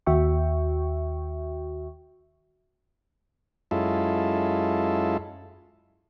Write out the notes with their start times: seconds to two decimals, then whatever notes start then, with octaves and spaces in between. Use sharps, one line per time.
0.06 D#2 F#4 E5 G5 C#6
3.71 F#2 G#3 E4 F4 A4